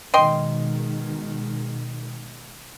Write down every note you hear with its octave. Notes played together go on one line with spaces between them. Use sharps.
B2 D#3 G#3 D#5 G5 C6